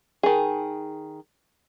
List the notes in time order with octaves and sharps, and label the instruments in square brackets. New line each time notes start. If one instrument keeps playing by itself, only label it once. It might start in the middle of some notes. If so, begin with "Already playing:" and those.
[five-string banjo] D#3 G#4